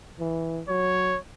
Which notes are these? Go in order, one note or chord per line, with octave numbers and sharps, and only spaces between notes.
E3
F#3 C#5